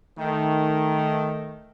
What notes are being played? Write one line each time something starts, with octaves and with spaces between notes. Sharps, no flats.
D#3 A3